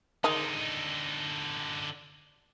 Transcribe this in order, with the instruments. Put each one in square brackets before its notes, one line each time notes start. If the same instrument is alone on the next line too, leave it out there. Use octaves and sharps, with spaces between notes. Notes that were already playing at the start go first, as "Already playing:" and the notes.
[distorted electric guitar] D3 D#4 [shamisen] D#3 G#3